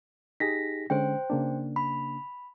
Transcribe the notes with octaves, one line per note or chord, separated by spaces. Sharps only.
D#4 G4 G#4 A#6 B6
D3 G#3 C#4 C5 G5
C#3 A#3 D4
B5